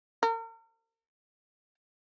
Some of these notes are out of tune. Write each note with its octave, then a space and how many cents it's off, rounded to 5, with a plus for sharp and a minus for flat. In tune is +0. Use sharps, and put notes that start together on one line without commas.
A#4 -40